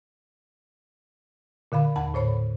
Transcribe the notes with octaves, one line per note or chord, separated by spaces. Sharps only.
A#2 D3 F5 B5
D#2 F#5 A5 B5
A2 C5 C#5 B5